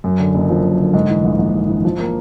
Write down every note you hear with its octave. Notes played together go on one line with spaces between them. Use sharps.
F#2
D3
F#1
F3
F#2
D3
G#2
E3
A#1
A#1
G#2
E3
F3
A#3